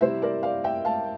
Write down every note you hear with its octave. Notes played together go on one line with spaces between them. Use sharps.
C3 G3 C4 E4 C5 E5
A#4 D5
D5 F5
E5 G5
F5 A5